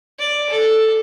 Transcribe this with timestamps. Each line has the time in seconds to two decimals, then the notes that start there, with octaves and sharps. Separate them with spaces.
0.19 D5
0.50 A4